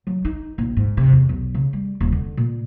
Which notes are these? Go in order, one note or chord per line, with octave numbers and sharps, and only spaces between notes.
F#3
D#4
A#1
G#2
C3
E2
B1
C#3
G3
D#1
D3
A#2